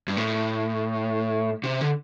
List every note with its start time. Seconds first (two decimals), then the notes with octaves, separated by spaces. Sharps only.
0.08 G2
0.17 A2
1.63 C3
1.81 D3